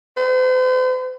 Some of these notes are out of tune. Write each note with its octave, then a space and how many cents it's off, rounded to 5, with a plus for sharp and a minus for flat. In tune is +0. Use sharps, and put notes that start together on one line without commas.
C5 -45